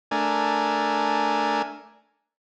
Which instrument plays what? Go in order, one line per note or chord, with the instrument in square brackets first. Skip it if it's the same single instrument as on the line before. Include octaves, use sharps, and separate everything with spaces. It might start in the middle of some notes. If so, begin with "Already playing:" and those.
[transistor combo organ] A3 D4 A#4 G#5